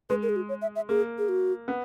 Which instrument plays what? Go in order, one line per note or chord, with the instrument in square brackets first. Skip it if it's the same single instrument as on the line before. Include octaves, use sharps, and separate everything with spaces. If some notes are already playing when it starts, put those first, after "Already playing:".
[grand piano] G#3 [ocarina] B4
[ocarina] A#4
G#4
F#4
C#5
E5
E5
[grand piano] A#3 [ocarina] G#4
[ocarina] G#4
F#4
[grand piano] B3